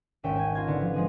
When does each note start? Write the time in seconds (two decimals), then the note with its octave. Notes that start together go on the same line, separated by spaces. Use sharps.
0.23 G#1 D#2 C#4 E5 G5
0.36 G#5 G#6
0.54 F4 A#5 G#6 A#6
0.67 D3 B3 E4
0.81 F3
0.94 F3 G#3 D4 G#4